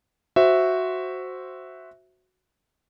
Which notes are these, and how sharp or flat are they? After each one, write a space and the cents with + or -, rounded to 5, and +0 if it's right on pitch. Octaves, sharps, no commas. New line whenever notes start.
F#4 +0 C5 +0 E5 +0